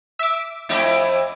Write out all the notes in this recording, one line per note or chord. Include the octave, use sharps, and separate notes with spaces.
E5 D6
F2 A3 E4 G4 D5 D#5